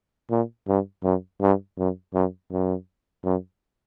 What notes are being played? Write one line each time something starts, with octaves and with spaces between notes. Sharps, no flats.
A#2
G2
F#2
G2
F#2
F#2
F#2
F#2